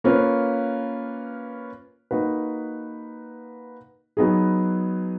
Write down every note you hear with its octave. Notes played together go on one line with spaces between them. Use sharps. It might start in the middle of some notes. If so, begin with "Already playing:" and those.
A#3 C#4 F4 B4
A#3 D#4 F#4 B4
F#3 B3 D#4 G#4